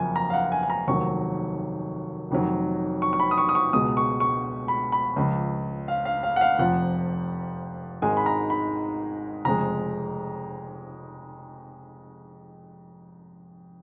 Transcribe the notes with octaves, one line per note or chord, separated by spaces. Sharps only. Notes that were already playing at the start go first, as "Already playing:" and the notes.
Already playing: F#1 F2 F3 G#5
A#5
F5
F#5
G#5
G#5
A#5
F1 D#2 D#3 F#3 C#6
F1 F2 D#3 F#3
C#6
C#6
B5
D#6
C#6
D#6
C#6
C#2 B2 G#3 D#6
C#6
C#6
B5
B5
C#2 C#3 F3
F5
F5
F5
F#5
F5
F1 F2 F3 F#5
G#1 G#2 D#3 G#3 G#5
B5
A#5
B5
F1 F2 C#3 G#3 A#5